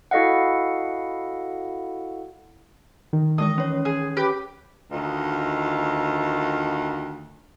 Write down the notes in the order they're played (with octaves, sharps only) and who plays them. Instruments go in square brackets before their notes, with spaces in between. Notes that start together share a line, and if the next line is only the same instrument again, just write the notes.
[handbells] E4 F#4 A4 D#5 F5 F#5
[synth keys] D#3
[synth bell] E3 G#3 D#6 [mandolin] D#5
[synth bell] C#4 C#5
[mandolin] G#4
G4 B4
[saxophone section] D2 D#3 D#4 F4